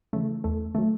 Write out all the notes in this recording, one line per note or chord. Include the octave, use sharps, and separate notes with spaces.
C#3 E3 A3
E2 A3
D#3 F#3 A3